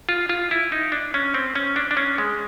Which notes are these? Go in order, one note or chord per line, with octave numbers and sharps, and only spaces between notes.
F4
F4
E4
D#4
D4
C#4
C4
C#4
D4
D4
C#4
G#3